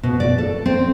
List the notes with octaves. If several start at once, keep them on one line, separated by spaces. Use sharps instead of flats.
B2
D5
A4
C4